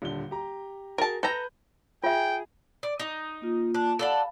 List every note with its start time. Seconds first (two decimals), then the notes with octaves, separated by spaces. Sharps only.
0.02 D#1 D3 G7
0.31 G4 A#5
0.98 F#4 G#4 A#4 A5
1.23 A4 B4 A#5 G6 A#6
2.03 F4 G#4 E5 G5
2.83 D5
3.00 D#4
3.42 A#3 F4
3.74 D4
3.99 A4 D5 F5 F#5 B5